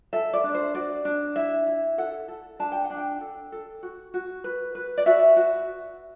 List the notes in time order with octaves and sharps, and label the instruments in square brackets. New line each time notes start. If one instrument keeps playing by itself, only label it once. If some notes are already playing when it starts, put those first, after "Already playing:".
[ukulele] A4 E5
D5
D4
C5
F#4 D5
D4
E4 E5
E4
A4 F#5
A4
D4 A5
G5
F#5
D4
G5
A4
A4
F#4
F#4
B4
B4
D5
F#4 E5
F#4